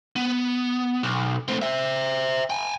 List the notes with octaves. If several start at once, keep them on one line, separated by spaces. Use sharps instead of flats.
B3
B1
A3 C4
C5 E5
G5 G#5